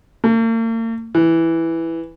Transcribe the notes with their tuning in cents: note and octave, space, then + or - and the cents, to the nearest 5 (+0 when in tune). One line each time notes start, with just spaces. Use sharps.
A#3 -45
E3 +0